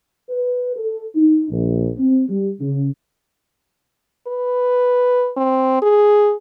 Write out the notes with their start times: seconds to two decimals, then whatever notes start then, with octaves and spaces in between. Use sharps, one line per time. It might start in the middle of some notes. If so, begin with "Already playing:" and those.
0.29 B4
0.76 A4
1.15 D#4
1.51 A#1
1.97 C4
2.29 G3
2.60 C#3
4.27 B4
5.37 C4
5.82 G#4